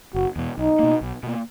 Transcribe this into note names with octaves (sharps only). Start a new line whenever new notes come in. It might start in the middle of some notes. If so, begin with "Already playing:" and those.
F#1 F#4
E2 B2
B1 D#4
B2 A#3
B1
B2 A#3